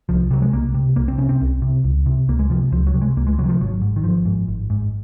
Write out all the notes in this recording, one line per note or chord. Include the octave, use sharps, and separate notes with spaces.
C2 F3
C3 F#3
G#3
C2 A#3
C3
C2 A#3
C4
C3 C#4
C4
C2
C3
C#2
C3
C#2 A#3
G#3
C3 F3
C#2 F3
F#3
C3
G#3
C#2 A#3
G#3
C3 F#3
D#3
F3
G#1 F#3
G#2
D#3
G#1 F3
G#2
G#1
G#2